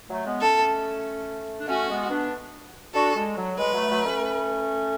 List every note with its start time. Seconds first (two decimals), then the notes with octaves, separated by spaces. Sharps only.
0.10 F#3 A3
0.25 G#3 B3
0.41 A3 C#4 A4
1.58 D4
1.67 A3 C#4 F#4
1.89 G#3 B3
2.10 B3 D4
2.94 D4 F#4 A4
3.16 G#3
3.36 F#3
3.58 G#3 B4
3.73 F#3 A3
3.90 F#3 A3
4.05 A3 C#4